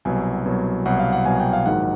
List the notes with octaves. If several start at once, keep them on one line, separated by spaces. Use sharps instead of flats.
C2 B2 F#3 G#5
C2 B2 F#3
C2 B2 F#3 F#5
F5
F#5
C2 B2 F#3 G#5
G5
F5
A#1 G#2 D#3 F#3 F#5